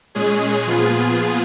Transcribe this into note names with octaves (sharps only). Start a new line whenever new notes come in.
A#2 G#3 C#4 G#4
A#2 F3 B3 F4 G#4